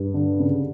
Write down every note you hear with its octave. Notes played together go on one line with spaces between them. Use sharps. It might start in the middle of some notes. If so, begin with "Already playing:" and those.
Already playing: G2
D3
C#3